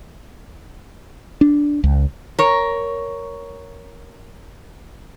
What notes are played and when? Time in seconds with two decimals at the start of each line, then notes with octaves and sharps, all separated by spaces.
1.41 D4
1.84 C#2
2.39 A#4 C#5